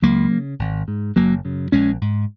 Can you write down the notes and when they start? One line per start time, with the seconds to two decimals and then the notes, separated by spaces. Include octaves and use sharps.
0.02 C#2 F#3 A#3
0.31 C#3
0.59 G#1
0.88 G#2
1.16 F#1 F#3 A#3
1.45 F#2 C#3
1.72 A#1 G#3 C#4
2.01 G#2